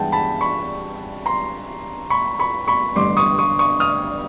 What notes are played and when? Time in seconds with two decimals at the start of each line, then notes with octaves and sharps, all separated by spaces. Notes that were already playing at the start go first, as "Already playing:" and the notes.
Already playing: G2 E3 G#3 B3 F#5 G5 A5
0.12 A5 B5
0.41 B5 C#6
1.26 A#5 C6
2.10 B5 C#6
2.39 B5 C#6
2.68 B5 C#6
2.96 A1 G2 D3 C6 D6
3.17 C#6 D#6
3.38 C#6 D#6
3.59 C#6 D#6
3.80 D#6 F6